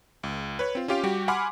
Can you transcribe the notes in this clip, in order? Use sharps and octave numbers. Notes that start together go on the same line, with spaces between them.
C#2
B4 C#5
C4 F4
C#4 F4 G4 F5 D7
G3 F#4 G4
F#5 G#5 B5 C6 D6 F6